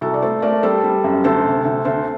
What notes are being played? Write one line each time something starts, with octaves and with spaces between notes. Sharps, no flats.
C2 F#4 A4
D5
A3 A4 C5
A3 A#4 D5
G3 A4 C5
G3
F#2
D2 A4 C5
C3
D2
D2 A4 C5